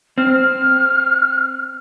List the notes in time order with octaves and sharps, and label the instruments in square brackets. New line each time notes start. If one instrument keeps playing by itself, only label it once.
[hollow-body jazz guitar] C4 [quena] F6